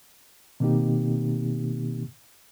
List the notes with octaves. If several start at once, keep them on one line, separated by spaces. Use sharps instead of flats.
B2 D#3 A#3 C4 D#4 G4